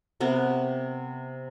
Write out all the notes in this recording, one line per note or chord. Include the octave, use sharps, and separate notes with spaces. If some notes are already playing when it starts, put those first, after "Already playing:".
C3 B3 A#4